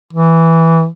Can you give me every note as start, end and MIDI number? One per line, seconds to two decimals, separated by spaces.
0.13 0.87 52